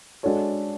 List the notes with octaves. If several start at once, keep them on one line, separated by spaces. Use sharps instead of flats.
G#3 D4 F#4 A4 C#5